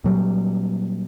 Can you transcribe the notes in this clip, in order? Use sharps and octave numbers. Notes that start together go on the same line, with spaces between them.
A#2 F#3 G3